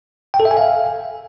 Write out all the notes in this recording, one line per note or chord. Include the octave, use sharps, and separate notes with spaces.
G5
A4
E5
G#5
F5